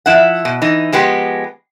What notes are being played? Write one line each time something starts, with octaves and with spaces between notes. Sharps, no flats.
F3 E4 F#5
B2
E3 D#4
F3 G#3 B3 G4